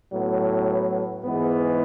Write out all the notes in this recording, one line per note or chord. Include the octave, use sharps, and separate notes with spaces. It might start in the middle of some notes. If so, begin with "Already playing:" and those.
A2 F#3 B3
G#2 E3 G#3 B3